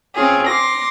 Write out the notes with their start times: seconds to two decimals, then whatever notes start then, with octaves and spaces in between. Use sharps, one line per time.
0.16 C4 C#4 F4 G#4
0.47 C6 D6 A#6